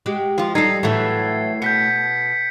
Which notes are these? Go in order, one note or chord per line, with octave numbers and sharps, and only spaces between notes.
G#3 F#4 G4
F3 F4
G3 D#4 A4 G#6 C7
A2 E3 F#3 A3
B2 G6 B6 C#7